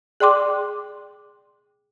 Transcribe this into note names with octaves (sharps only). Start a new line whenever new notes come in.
G#4 D5 G5 C6 D6